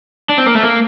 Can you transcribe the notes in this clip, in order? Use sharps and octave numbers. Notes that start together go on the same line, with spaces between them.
D4
C4
A#3
A3
A#3